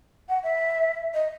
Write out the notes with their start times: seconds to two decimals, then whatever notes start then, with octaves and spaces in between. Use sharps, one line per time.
0.29 F#5
0.43 E5
1.14 D#5